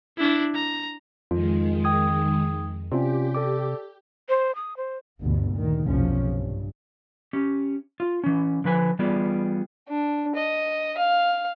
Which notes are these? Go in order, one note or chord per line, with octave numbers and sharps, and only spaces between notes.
D4 E4
A#5
F2 D#3 G#3 F4
G5 D#6 G#6
C3 C#4 F4 G4 D5
A4 D5 D6
C5
D#6
C5
G1 D2 B2
D2 A#2 D#3
F#1 B1 E2 C3 F3 C#4
G2
C#4 G4
F4
E3 C#4
D3 F3 B4 G#5
E3 G3 B3 F4 G#4 D5
D4
D#5
F5